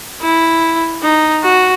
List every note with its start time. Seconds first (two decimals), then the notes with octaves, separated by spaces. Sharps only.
0.22 E4
1.03 D#4
1.44 F#4